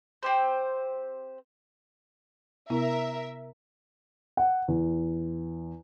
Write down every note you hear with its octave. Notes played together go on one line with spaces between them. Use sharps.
C4 G4 C5
C3 B3 E4 A#4 E5
F#5
E2